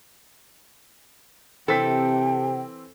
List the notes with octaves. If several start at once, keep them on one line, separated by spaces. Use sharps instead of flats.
C3 E3 C4 A4 G5 B6